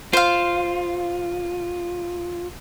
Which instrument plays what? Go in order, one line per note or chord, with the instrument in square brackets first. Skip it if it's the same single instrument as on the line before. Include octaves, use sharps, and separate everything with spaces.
[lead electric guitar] F4 [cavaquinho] C5 F5